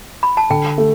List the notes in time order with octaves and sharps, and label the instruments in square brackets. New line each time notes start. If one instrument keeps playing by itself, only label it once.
[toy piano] B5
A5
[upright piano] D3 [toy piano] G5
[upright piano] A3